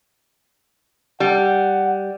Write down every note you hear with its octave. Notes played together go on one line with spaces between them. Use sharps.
G3 F#5